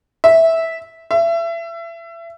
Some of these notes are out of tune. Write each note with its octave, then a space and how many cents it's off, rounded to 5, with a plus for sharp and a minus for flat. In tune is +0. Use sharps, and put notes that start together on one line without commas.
E5 -10
E5 +30